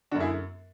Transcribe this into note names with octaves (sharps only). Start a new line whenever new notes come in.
F#2 D3 D4 F#4
E4 G#4